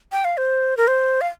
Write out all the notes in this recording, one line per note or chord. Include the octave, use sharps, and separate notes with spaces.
G5
F5
C5
A#4
C5
F5